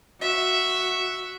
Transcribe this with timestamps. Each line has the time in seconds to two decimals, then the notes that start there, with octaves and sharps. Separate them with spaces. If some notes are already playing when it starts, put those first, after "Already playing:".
0.21 F#4 E5